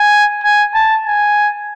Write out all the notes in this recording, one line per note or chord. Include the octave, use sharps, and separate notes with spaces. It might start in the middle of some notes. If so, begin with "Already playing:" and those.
Already playing: G#5
G#5
A5
G#5